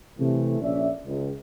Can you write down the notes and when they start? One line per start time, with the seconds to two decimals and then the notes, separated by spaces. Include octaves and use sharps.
0.19 C3 E3 A3
0.61 A#1 C#4 D5 E5
1.05 C#2